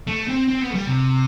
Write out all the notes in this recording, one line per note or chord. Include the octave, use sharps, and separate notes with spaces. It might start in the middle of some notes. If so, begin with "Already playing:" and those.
A3
C4
C4
B3
A3
G3
C3